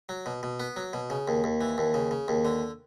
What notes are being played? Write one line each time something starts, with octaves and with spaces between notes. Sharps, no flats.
F#3
B2
B2
B3
F#3
B2
C#3
D#2
D#2
E3
D#2
C#3
C#3
D#2
D3